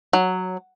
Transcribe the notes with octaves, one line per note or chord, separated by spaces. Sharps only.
F#3